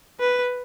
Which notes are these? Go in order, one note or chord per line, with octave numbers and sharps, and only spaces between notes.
B4